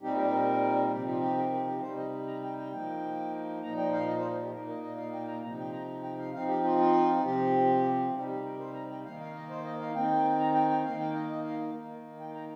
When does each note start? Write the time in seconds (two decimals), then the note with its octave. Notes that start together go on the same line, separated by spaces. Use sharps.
0.02 A#2 G3 C4 D#4 G4
0.16 A#4
0.25 G4
0.32 A#4
0.92 C3 F3 C4 D#4 G4
1.08 F4
1.22 G4
1.37 A#4
1.53 G4
1.67 G4
1.82 C3 G3 D#4 C5
1.97 D#5
2.27 A#5
2.43 G5
2.58 G5
2.72 F3 A#3 D#4
3.63 A#2 F3 D#4 A#5
3.77 G5
3.93 F5
4.08 D#5
4.19 C5
4.42 G4
4.53 A#2 A#3 D#4 A#4
4.69 D#5
4.83 D#5
4.97 F5
5.13 G5
5.28 A#5
5.43 C3 F3 D#4 A#5
5.58 G5
5.73 A#5
6.03 G5
6.19 F5
6.33 F3 C4 D#4 F5
6.48 G4
6.64 F4
6.78 F4
7.24 C3 F3 C4 G4
8.14 C3 G3 D#4 G4
8.28 G4
8.44 A#4
8.58 C5
8.73 A#5
8.90 G5
9.04 D#3 A#3 D#4 F5
9.20 F5
9.34 D#5
9.50 C5
9.64 D#5
9.80 F5
9.94 D#3 C4 D#4 G5
10.39 A#5
10.54 G5
10.70 G5
10.85 D#3 A#3 D#4 F5
10.99 G5
11.14 D#5
11.30 D#5
11.44 F5
11.75 D#3 A#3 D#4
12.20 G5
12.35 A#5